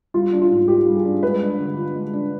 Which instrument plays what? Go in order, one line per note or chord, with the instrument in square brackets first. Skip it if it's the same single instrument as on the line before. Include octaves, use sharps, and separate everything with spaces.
[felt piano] G3 [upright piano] F4
[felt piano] D4
[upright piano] F4
[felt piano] G#2
[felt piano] F4 [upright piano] G4
[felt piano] G3
[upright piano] G#4
[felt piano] D4
[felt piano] G#3 [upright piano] B4
[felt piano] D4
D3
F4
G#3
D4